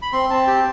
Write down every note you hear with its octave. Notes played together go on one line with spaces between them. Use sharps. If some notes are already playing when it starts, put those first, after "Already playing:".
B5
C4 C6
C4 A5
G4